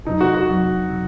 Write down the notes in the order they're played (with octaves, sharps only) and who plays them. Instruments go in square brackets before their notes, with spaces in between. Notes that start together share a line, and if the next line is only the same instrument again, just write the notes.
[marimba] F2 C3 F#3 [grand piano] D#4
[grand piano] F#4
F#4
[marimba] F2 C3 F#3
C3 F#3